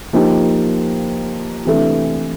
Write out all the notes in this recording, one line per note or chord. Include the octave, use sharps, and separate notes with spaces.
F3 A#3 D#4 G4
C3 E3 A3 D4